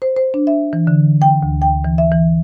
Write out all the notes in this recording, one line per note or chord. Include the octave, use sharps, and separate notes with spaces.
C5
C5
D4
E5
E3
D3
G5
D2
G5
E3
E5
E3